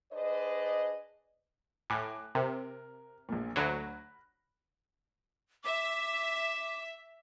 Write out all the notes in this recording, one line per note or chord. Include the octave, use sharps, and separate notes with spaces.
D4 G#4 B4 C5 D5 D#5
A2 G#5 D6 F#6
C3 A#4
A#1 A#2
D2 F#3 B5 F#6 A#6
E5 D6